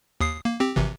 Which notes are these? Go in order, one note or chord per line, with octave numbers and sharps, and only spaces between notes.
D#2 D#6 C7
A#3
C4 G4
G#1 C3 E3